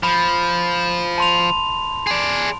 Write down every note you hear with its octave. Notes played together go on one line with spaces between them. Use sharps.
F3 B5
A5 C6 F7
G#4 D5